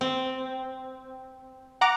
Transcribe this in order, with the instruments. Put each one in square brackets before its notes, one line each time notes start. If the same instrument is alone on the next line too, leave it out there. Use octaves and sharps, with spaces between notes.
[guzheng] C4
[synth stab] F#5 A#5 D6